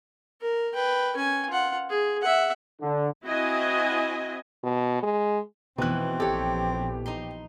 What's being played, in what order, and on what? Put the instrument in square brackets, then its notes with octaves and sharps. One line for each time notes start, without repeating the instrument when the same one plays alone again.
[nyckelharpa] A#4
B4 G5
C#4 G#5
F4 F#5
G#4
E5 F#5
[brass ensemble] D3
[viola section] C4 E4 F#4 D#5 G#5
[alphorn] B2
G#3
[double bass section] F1 [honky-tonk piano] B2 F#6 [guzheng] E3 D#4 [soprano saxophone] C4
[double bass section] A#1 F3 B3 [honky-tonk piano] G4 [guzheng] A4 C#5
[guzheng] D#4 A#5 C6